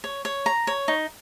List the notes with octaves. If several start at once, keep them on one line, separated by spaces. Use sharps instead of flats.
C#5
C#5
A#5
C#5
D#4